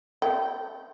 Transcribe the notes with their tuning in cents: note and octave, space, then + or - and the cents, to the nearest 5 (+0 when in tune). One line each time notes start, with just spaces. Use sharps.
G5 -20